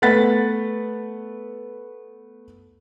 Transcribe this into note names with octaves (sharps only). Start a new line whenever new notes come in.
A3 B3 F#5 B5 A6 B6